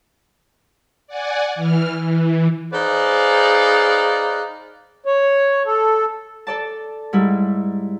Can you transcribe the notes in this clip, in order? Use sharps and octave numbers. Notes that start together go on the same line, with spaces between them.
D5 F#5 G#5
E3 F6
E3
D#4 G#4 B4 C5 D5 F5
C#5
A4
A4 D5 A5
G#2 G3 E4